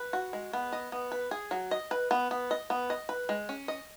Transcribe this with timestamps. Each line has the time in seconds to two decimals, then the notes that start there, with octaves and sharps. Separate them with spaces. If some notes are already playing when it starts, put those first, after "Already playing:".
Already playing: B4
0.13 F#4
0.33 G#3
0.53 B3
0.72 D#5
0.92 B3
1.12 B4
1.31 G#4
1.51 F#3
1.71 D#5
1.91 B4
2.11 B3
2.31 B3
2.51 D#5
2.70 B3
2.90 D#5
3.09 B4
3.29 G#3
3.49 C#4
3.68 D#5